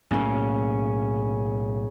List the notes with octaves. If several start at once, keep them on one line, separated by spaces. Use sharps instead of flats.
B1 A2 C#3 A#3 C#4